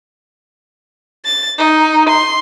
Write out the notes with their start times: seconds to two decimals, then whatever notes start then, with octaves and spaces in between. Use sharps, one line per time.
1.25 A6
1.58 D#4
2.09 C6